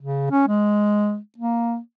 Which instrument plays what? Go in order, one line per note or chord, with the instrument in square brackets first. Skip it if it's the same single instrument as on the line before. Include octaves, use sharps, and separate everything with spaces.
[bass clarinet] C#3
C#4
G#3
A#3